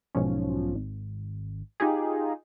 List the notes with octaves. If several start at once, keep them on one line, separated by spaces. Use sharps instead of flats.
B1 G#2 F3 C#4
G#1
D#4 F4 G4 G#4